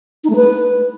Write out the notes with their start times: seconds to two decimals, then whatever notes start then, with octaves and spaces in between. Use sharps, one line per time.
0.24 D#4
0.30 A3
0.36 B4